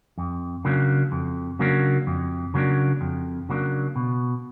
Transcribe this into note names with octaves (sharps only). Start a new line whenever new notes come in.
F2
C#3 F#3 A#3 D4
F2
C#3 F#3 A#3 D4
F2
C#3 F#3 A#3 D4
F2
C#3 F#3 A#3 D4
B2